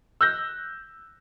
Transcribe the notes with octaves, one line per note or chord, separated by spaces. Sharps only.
E6 F#6 G6 A#6